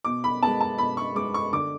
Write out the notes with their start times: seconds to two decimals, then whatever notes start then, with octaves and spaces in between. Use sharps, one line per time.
0.05 B2 D6
0.24 B5
0.42 G#3 B3 A5
0.61 A5
0.78 B2 B5
0.97 C#6
1.15 G#3 B3 D6
1.34 C#6
1.53 D3 D6